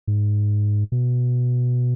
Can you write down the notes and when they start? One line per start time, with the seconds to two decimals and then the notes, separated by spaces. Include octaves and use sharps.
0.07 G#2
0.92 B2